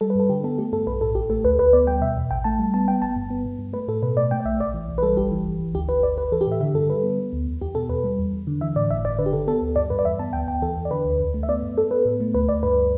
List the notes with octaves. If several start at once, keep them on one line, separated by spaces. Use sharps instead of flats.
G3 A4
B4
G2 A4
D3 G4
B3 A4
A3 G4
G2 A4
B1 B4
A2 A4
A1 G4
A3 A4
D2 B4
D2 B4
B3 D5
G3 G5
B2 E5
E2
A1 G5
A3 A5
G3
B3 A5
B3 G5
G1 A5
G2
B3
G2
G2
A3 B4
A2 A4
B2 B4
A3 D5
A3 G5
D5
B1 E5
A1 D5
E3
B1
B4
G3 A4
G1 G4
E3
G1
G1
D2 G4
D2 B4
G1 D5
G1 B4
E3 A4
G4
A2 E5
D3 E5
G2 A4
G3 B4
B3
B3
D2
E2
E2 G4
B2 A4
E2 B4
G3
E2
E2
D3
E3 E5
A2 D5
G1 E5
G1 D5
D3 B4
G4
D3 A4
B3 A4
D2
G2 D5
G2 B4
D5
E2 E5
B3 A5
D2 G5
D2 G5
E3 A4
E2
D5
D3 B4
D2
E2
A3
E5
B3 D5
G2
B3 A4
B3 B4
A2
A3
D2 B4
D2 D5
G2 B4